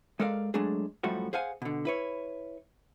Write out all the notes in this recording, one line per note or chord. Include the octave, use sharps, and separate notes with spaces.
G#3 A4 A#4 D5 F5
F#3 G#3 A3 D4 G#4
F#2 A2 F3 G3 A3 F#4
G#4 C5 F5 F#5 G#5
B2 D3
E4 B4 C#5